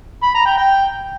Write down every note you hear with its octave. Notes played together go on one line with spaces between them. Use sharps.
B5
A#5
G5
G5